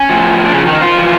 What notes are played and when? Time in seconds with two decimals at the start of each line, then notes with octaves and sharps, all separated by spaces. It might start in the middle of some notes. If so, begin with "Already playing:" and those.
Already playing: C#4
0.09 A2 F3
0.45 D4
0.52 C#3 C#4
0.66 D#3 D#4
0.81 F3 F4
0.97 C3 E3